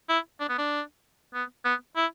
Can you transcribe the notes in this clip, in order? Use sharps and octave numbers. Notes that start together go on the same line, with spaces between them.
E4
D4
B3
D4
B3
B3
E4